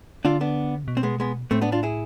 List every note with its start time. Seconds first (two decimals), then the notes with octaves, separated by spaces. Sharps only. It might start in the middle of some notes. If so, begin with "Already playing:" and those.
0.25 D3 D4 F4
0.41 B3 D4
0.84 C3
0.88 B2
0.97 C4
1.03 G#3 B3
1.20 G#3 B3
1.51 A2 A3 C4
1.62 B3 D4
1.72 D4 F4
1.83 E4 G#4